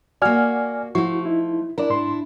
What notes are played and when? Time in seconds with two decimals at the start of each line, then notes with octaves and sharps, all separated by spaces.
0.22 A#3 F#4 D5 G#5 F6
0.95 F3 A3 E4 F#4 C#6
1.25 D#4 E4
1.78 D4 E4 A#4 D5
1.90 G#2 C6